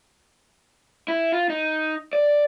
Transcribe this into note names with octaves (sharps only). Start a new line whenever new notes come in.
E4
F4
D#4
D5